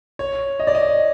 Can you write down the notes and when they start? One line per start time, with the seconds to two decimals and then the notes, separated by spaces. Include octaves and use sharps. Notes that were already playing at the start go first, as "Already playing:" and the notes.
0.19 C#5
0.60 D#5
0.67 D5
0.75 D#5